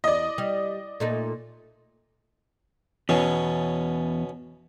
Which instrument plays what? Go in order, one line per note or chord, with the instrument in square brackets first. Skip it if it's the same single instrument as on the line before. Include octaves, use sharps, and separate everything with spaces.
[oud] E2 [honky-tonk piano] D5 D#5
[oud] G3
A#2 A3 D#4
[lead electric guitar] E2 [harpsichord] B2 C#4